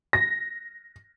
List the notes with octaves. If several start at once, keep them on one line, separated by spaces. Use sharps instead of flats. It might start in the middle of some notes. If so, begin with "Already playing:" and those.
A#6